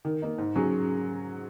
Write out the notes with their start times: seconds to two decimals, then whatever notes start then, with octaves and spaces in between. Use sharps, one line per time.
0.05 D#3
0.22 A#3 D#4
0.38 G#2
0.56 F#3 C#4 G#4